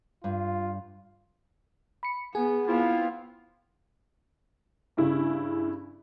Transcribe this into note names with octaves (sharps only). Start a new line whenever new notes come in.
G2 F4
B5 C#7
B3 G#4 G#5
B3 C4 E4 F4 F5
G2 C#3 E4